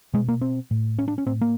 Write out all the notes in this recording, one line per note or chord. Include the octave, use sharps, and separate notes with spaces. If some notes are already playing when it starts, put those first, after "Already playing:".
B2 G#3
A#3
C4
A2
C#4
D4
C#4
A2 C4
A#3